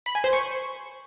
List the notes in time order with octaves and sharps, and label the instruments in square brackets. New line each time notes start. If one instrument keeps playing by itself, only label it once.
[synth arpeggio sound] B5
G#5
C5
C#6